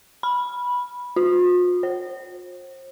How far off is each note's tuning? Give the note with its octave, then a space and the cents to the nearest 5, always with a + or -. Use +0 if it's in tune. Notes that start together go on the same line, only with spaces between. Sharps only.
B5 -10
F4 +45
C5 +40